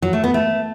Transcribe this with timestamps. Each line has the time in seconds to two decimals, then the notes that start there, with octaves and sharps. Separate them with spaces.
0.02 F#3
0.13 A3
0.24 B3
0.34 A3